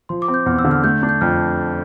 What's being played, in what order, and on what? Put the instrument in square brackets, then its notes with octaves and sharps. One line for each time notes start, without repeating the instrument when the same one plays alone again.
[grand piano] F3 [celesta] C6
[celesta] D6
[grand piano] C4
[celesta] G6
[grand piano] E2 [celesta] F6
[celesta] E6
[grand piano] D3
[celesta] F6
[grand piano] A3 [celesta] G6
[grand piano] D4
[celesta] G6
[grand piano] F2 [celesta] F6